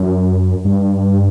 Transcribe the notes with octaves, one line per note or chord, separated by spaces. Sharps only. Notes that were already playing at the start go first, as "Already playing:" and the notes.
Already playing: F#2
G2